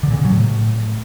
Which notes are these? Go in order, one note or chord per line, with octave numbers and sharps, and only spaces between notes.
D3
A#2
C#3
F#3
A2